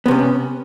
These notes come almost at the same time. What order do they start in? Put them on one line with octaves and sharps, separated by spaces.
B3 C3 C#4